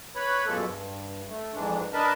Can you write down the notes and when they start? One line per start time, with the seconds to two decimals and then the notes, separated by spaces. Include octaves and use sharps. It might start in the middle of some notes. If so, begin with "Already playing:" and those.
0.16 B4 C#5 B5
0.46 F#2 B2 F3 G#3 A#3 A4
0.63 G2
1.28 A3
1.54 F2 G#2 E3 G#3 D4
1.93 D4 A#4 B4 D#5 A5 B5